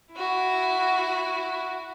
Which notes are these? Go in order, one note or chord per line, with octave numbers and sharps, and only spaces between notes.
E4 F#4